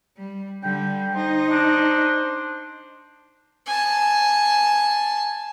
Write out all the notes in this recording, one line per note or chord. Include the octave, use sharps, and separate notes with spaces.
G3
D3 G3 G5
D#4 C5
D4
G#5 A5